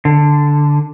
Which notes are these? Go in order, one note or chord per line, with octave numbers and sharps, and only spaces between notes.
D3